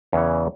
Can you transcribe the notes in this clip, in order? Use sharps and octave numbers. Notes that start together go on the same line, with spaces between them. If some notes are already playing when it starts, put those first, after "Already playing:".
E2 C#3 E3 C#5